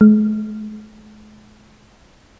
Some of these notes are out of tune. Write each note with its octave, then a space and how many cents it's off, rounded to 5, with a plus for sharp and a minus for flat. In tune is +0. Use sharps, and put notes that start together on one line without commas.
G#3 +45